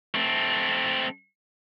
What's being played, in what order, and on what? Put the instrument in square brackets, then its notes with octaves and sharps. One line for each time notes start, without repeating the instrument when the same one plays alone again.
[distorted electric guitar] A3 C4